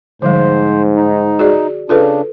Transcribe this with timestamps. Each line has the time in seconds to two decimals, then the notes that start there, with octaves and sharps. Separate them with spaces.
0.22 G#2 D3 F3 G3 C5
0.96 D#4
1.39 F#4 G#4 D5
1.89 C#3 D4 F4 A4 B4